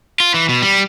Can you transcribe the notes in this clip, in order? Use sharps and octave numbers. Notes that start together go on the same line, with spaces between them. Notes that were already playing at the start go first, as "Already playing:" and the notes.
F4
E3
B2
G3